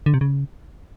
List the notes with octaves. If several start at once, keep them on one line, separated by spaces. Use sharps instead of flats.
D3
C3
C#3